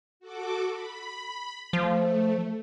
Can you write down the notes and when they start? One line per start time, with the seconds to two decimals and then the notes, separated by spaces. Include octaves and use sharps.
0.20 F#4 A4 D6
0.70 B5
1.73 F3 A3